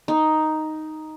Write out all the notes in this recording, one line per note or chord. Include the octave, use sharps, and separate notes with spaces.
D#4